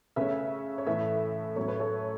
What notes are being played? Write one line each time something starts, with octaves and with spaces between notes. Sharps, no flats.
C#3 A3 C#4 B4 E5
C#5
A2 E3 A3 B4 E5
A2 F#3 A3 C#4 C#5
B4
A4 C#5